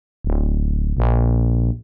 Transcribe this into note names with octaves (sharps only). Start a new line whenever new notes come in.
D1
A#1